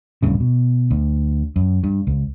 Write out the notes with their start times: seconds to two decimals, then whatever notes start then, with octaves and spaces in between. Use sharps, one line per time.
0.22 D1 G2 C#3
0.40 B2
0.91 D2
1.56 F#2
1.84 G2
2.07 C#2